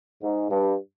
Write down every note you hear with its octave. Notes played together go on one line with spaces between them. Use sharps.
G#2
G2